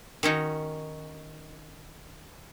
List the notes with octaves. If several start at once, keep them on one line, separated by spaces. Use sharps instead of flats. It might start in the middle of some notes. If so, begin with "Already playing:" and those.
D#3 C#4 D#4 F#4